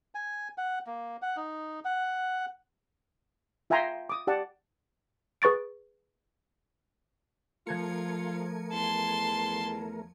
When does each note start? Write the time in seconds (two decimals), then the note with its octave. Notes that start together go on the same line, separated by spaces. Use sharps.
0.15 G#5
0.58 F#5
0.87 A#3
1.22 F#5
1.37 D#4
1.85 F#5
3.70 F4 E5 G5 G#5 A#5 C6
4.09 D6 D#6
4.27 G4 D5 F#5 A5
5.42 G#4 B4 C#6 A6 D7
7.67 F3 A3 F4 A#4 G#6 C#7
8.72 E2 A5 C6